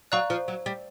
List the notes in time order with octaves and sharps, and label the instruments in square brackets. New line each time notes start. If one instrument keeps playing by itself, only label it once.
[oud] F#3 [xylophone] D5 F5 A#5 C#6 F#6
[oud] F3
F#3
G3